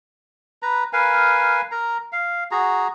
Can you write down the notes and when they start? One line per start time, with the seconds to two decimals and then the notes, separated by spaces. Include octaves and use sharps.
0.62 B4 A#5
0.93 A#4 B4 F5 G#5
1.72 A#4 A#5
2.12 F5
2.51 F#4 G#4 A#5